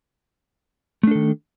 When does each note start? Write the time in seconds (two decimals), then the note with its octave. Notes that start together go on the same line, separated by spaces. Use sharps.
1.03 A3
1.07 D4
1.11 A4
1.15 D#3